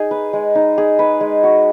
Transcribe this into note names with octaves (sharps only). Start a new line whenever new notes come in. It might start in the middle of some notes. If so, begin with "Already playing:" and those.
Already playing: D#4 G#4
B4
G#3
D#4
G#4
B4
G#3
F#4